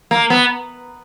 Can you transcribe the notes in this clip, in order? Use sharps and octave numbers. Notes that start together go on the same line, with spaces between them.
A#3
B3